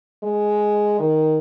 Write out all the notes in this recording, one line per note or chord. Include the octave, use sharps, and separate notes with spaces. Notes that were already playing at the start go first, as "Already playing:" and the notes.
G#3
D#3